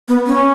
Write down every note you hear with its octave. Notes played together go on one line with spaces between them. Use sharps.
B3
C#4